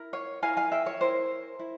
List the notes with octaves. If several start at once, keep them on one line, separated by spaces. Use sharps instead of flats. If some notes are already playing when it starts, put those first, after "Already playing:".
Already playing: E4 A#4
C#5 F5
E4 A#4 F5 G#5
F5 G#5
E5 G5
C#5
E4 A#4 C5
E4